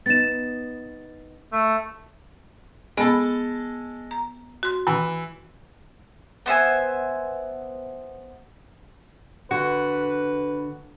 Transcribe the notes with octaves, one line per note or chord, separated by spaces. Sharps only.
B3 D#4 A6 E7
A3
G#3 B3 A4 B5
A#5
F#4 C6
E3
B3 C5 E5 G#5
D3 F#4 B4